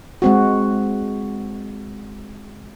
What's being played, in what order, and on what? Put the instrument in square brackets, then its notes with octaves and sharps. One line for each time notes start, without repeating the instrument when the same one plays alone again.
[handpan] G#3 C4 F#4